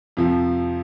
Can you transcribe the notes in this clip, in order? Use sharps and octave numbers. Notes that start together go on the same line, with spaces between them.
F2 C3 F3